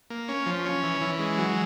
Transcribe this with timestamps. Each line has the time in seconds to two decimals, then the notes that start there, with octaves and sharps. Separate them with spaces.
0.10 A#3
0.28 C#4
0.46 F3
0.65 C#4
0.83 E3
1.01 E3
1.19 G#3
1.38 F#3